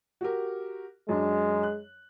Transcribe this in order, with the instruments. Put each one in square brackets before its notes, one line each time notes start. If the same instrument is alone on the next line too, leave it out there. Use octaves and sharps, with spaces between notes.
[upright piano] F#4 G4 A#4
[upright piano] F#2 D4 [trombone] G#3
[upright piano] F#6